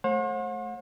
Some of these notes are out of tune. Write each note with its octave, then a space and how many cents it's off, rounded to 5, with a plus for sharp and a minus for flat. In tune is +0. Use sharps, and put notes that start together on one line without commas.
A3 -10 C5 +45 F#5 -40